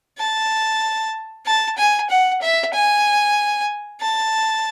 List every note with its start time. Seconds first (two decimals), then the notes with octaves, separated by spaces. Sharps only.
0.18 A5
1.46 A5
1.77 G#5
2.10 F#5
2.41 E5
2.73 G#5
4.01 A5